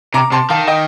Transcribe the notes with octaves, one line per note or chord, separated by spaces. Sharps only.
C3 A#5 D6
C3 A5 C6
D#3 F5 A5
D#5 G5